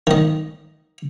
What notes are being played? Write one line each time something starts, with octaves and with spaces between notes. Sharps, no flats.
D#3 D#5